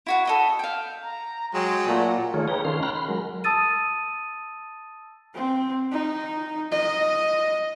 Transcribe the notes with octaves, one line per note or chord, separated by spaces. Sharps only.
E4 F#4 F#5
A4 D#5 B5
F5 G5
A#5
F#3 G#3 G5
A#2 A3 F#5
D#3 A3 F4 G#4 C#5
G#4 B4 C#5 G5 A#5
D#3 C#4 A4 F5 C6
G5 A#5 B5 F6 F#6
B5 C6
F#3 G#3 A#4
A5 D#6 E6 A6 D#7
C4
D#4
D#5